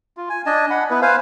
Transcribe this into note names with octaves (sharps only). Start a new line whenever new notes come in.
F4
G#5
D4 D#5 G#5 A5
F#5 B5
B3 E4 B4
B4 C5 F5 G#5